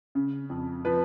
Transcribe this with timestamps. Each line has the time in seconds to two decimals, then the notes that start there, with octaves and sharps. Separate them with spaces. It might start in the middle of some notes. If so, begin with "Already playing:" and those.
0.15 C#3
0.50 F2
0.85 F3 B4